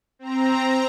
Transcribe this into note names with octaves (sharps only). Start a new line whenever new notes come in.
C4 A#5